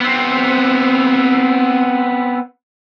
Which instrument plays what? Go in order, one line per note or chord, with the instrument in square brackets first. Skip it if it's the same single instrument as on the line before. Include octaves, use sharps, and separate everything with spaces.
[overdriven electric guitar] B3 C4